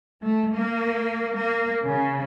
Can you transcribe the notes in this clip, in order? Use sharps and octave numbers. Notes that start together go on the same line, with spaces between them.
A3
A#3
A#3
C#3